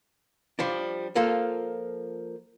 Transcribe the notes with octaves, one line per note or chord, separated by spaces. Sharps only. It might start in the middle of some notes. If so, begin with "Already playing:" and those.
F3 G3 D4
F3 A#3 F4 A4